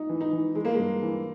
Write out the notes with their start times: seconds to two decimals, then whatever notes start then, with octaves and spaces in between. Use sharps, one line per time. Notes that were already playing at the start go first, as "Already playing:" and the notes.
Already playing: D#4
0.09 E3
0.21 D#4
0.33 E3
0.55 E3 G#3
0.65 A#3
0.74 G2 G#3
1.03 E3